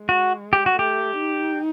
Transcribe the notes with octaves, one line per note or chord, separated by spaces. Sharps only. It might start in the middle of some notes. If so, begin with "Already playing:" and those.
Already playing: G#3
F#4
G4
F#4
A3 G4
D#4